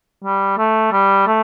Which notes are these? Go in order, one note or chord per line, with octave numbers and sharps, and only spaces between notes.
G3
A3
G3
A3